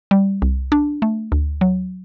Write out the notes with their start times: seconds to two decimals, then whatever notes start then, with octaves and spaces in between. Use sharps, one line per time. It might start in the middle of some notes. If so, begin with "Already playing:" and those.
0.11 G3
0.42 C2
0.72 D4
1.02 A3
1.32 D2
1.61 F#3